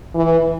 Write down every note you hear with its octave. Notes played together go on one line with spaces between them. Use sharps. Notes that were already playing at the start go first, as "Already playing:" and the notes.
E3